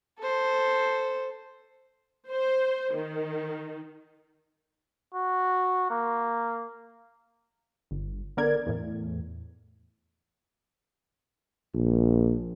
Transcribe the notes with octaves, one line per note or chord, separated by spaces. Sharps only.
A4 C5
C5
D#3
F#4
A#3
G1
D3 B3 A#4 D5 G#6
E2 A2
A#1